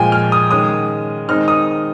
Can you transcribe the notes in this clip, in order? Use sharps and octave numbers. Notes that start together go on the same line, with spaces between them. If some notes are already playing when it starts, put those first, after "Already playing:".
Already playing: A#2 F3 G#3 G5 G#5
F6
D#6
D#3 G#3 C#4 D#6
D#3 G#3 C4 D#4 F6
D#6